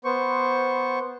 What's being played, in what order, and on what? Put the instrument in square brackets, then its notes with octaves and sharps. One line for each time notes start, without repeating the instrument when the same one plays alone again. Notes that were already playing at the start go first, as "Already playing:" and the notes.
[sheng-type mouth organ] B3 C5 C#6